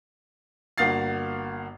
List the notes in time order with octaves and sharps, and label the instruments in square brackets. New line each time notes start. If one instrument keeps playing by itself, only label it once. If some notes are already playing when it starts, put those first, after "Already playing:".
[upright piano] G1 A#3 F#4 F5 A6 C7